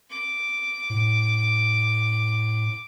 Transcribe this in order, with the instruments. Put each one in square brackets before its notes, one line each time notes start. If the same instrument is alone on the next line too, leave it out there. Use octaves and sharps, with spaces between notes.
[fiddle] D6
[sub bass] A2